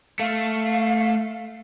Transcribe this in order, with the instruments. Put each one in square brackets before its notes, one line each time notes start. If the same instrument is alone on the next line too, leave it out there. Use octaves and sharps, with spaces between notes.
[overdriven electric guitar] A3 [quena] F5